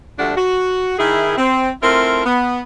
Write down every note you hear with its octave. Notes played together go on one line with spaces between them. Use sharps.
D2 F3 G3 A3 D4 F#5
F#4
D#3 E4 G#4
C4
A3 C4 E4 F4 A#4
B3